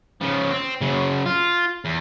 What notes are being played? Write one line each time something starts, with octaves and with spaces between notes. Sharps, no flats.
C#3 F3
C4
F#2 C#3
F4
E2